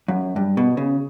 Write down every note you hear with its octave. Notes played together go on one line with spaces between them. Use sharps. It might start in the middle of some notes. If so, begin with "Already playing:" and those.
F#2
G2
B2
C#3